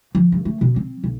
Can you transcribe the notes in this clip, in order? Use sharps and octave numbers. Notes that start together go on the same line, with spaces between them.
F3
G2
A3
B2
C4
B1